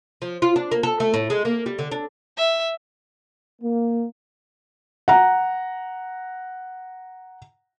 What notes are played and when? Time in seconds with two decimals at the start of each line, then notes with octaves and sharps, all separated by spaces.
0.22 F3
0.42 F4
0.56 D4
0.72 A#3
0.83 A4
1.00 A3
1.14 A2
1.30 G#3
1.45 A#3
1.66 G3
1.79 D3
1.91 D4
2.37 E5
3.62 A#3
5.08 F#5 A#5